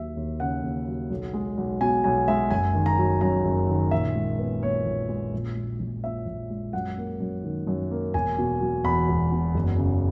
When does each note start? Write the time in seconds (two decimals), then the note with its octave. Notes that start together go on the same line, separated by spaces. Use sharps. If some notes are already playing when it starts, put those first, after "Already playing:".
Already playing: D#2 F#3 E5
0.16 D#2
0.40 C#3 F#5
0.64 D#2
0.88 F#3
1.10 B1
1.33 G#3
1.58 B1
1.81 B2 G#5
2.04 B1 G#5
2.28 G#3 E5
2.51 F#1 G#5
2.75 D#3
2.86 A#5
2.98 F#3
3.21 F#2 A#5
3.45 F#1
3.69 D#3
3.91 A#1 E5
4.15 G#3
4.39 B3
4.62 A#2 C#5
4.85 A#1
5.09 G#3
5.33 A#1
5.56 G#3
5.80 A#1
6.04 A#2 E5
6.26 A#1
6.50 G#3
6.73 F#2 F#5
6.98 A#3
7.20 F#2
7.44 D#3
7.67 F#2
7.91 A#3
8.14 E1 G#5
8.38 B2
8.61 F#3
8.84 E2 B5
9.09 E1
9.32 B2
9.54 F#1
9.79 C#3